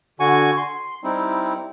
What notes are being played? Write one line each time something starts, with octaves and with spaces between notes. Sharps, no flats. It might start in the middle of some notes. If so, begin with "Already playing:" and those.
D3 F#4 G#5 C#6
C6
G3 C4 D#4 E4